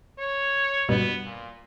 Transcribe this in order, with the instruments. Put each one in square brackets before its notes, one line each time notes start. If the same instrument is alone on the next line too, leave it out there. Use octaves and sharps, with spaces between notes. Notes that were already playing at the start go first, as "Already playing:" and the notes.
[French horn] C#5
[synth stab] G2 B2 [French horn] B3
[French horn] A#2